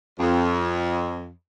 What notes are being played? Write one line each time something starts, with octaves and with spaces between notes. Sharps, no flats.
F2